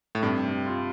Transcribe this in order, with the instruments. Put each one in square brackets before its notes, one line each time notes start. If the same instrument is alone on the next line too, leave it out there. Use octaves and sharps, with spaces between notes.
[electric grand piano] A2
[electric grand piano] G2 [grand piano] C3
[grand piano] G3
F4